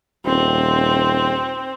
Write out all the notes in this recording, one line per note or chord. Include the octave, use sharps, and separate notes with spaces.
D#1 C4